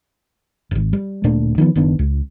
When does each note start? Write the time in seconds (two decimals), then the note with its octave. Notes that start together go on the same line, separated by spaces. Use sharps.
0.71 D1 G#1
0.93 G3
1.24 D1 A#2 A3 D4
1.58 D#3 F3 B3
1.76 F#1 D#3 B3 D4
1.99 C#2